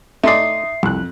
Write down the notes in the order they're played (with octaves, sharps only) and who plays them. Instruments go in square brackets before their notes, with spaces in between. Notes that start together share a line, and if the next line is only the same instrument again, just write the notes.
[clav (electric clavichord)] A3 D5 [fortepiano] D#4 C6 D#6 [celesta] E5 C7
[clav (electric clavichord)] C2 [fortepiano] F2 F#6